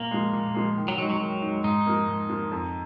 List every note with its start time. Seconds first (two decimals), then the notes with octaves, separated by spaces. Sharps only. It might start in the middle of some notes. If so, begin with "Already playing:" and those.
Already playing: A#2 A#3
0.11 F3 G#3
0.33 A#2
0.55 F3 G#3
0.77 D#3
0.88 F#3
0.98 F#3 G#3 D#4
1.10 F#3
1.20 D#3 F#3
1.42 G#3 D#4
1.64 G#2 D#4
1.86 F3 A#3
2.07 G#2
2.30 F3 A#3
2.52 F2